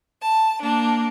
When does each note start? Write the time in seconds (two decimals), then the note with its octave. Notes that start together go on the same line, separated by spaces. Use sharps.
0.21 A5
0.60 A#3 D4